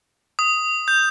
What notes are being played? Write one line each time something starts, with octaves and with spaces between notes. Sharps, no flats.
D#6
G6